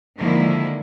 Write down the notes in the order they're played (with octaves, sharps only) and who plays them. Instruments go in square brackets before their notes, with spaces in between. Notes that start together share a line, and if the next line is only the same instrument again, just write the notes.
[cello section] D3 D#3 F3 G#3 A#3 E4